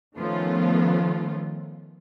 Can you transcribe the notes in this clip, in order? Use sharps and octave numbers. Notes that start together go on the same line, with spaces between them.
D#3 F3 A3 B3 C#4 F4